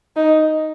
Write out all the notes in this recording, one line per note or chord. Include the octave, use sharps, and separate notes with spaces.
D#4